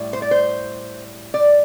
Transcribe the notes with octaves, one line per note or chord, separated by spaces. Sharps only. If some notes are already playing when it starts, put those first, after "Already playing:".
Already playing: A2 G3
C5
D5
C5
D5